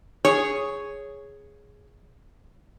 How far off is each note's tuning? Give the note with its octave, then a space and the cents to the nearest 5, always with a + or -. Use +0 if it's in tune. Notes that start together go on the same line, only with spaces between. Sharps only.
G#4 +0 C#5 +0